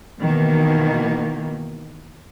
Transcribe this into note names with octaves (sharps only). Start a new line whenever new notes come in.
B2 D#3 E3 A#3